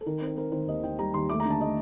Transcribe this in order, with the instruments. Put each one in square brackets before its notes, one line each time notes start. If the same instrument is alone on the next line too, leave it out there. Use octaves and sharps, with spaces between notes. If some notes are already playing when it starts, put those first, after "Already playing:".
[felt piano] A4
D#3 A#4
C4
C5
C4 A#4
D#3 C5
D#2 D#5
D#3 G5
G3 A#5
D#2 C6
A3 D6
A#5
D3
A5
A3 D#5